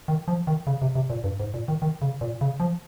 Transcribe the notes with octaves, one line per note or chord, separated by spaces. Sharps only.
D#3
F3
D#3
C#3
C3
C3
A#2
G2
G#2
A#2
D#3
D#3
C#3
A#2
C#3
F3